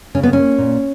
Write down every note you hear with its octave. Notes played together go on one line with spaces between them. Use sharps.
C#3 C#4
B3
A#3 C#4
A#2